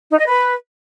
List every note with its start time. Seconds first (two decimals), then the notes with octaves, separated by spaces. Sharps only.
0.10 D#4
0.18 D#5
0.26 B4